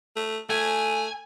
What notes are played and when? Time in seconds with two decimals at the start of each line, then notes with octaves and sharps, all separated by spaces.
0.16 A3
0.50 A3 G#5